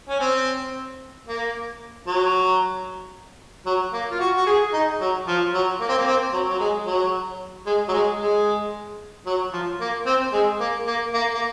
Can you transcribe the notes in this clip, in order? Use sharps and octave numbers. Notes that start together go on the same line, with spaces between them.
C#4
C4
A#3
F#3
F#3
A#3
F4
F#4
F#4
G#4
D#4
F#3
F3
F#3
A#3
C4
A#3
C4
F#3
F#3
G#3
F#3
G#3
F#3
G#3
G#3
F#3
F3
A#3
C4
G#3
A#3
A#3
A#3
A#3